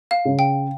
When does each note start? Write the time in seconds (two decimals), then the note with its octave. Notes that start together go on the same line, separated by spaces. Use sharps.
0.11 F5
0.25 C#3
0.39 G5